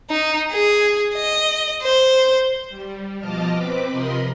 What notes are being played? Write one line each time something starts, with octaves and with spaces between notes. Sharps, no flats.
D#4
G#4
D#5
C5
G3
B2 F3 D#5 A5 D6 F6
C4 B4 D6 B6
C3 F3 A#4 D#5 B5 C6